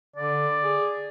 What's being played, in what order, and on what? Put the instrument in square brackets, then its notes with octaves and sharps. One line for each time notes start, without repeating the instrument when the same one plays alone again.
[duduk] D3 [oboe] D5
[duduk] G#4